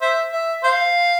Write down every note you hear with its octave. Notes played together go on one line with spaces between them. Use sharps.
C5 E5
E5
C5 F5